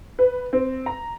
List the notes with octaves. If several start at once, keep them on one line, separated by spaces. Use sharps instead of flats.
B4
C4
A#5